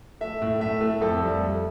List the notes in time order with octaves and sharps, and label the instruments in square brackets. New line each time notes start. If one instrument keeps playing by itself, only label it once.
[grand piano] A3 E5
A2
A3 E5
A3
F2 A4
G3
A3